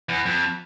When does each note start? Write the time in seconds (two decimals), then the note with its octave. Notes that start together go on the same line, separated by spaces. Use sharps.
0.09 E2
0.25 F2